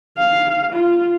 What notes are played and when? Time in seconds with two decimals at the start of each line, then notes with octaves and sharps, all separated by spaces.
0.17 F5
0.73 F4